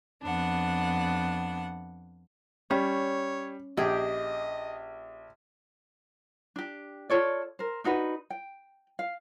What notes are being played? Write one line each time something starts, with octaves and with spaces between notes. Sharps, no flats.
F2 B3 D4 F#5
G3 C#4 C#5
A#1 G4 G#4 D#5
D4 G4
F4 A4 C#5 D5
A#4 C5
D4 D#4 F#4 B4
G5
F5